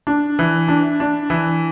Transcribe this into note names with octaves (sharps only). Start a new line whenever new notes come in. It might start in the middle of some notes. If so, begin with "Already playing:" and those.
D4
E3
D4
D4
E3